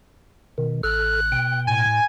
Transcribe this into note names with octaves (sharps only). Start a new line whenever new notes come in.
B2 D#3
A1 A4 F6 F#6
B2 G5
A2 G#5